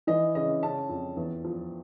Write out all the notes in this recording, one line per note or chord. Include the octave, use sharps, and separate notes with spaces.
E3 D#5
C#3 D#5
C#3 A5
F2
E2
F3